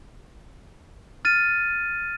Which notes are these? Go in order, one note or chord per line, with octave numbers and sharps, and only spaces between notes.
F6 A6 D#7